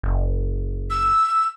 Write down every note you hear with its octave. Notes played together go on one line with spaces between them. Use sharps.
F#1
E6